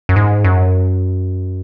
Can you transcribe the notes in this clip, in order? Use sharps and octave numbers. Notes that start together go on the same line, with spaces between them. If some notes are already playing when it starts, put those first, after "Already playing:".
F#2
G#2
F#2